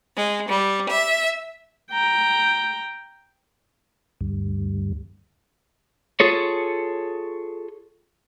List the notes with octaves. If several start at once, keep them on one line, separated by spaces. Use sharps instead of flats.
G#3
G3
E5
G5 A#5
D2 G2
F4 G#4 A4 C#5